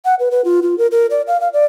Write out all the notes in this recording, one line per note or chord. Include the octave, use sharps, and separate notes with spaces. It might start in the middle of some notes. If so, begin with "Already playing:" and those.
F#5
B4
B4
F4
F4
A#4
A#4
D5
F5
F5
D5